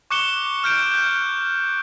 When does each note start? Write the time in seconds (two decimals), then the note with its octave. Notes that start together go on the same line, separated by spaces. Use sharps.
0.11 C#6 D6 F#6 C#7 E7 G7
0.64 F6 G6 D7
0.92 F#6 G6